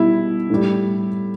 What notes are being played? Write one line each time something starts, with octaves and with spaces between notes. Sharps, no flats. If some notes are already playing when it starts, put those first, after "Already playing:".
Already playing: B2 G3 E4
A2 G3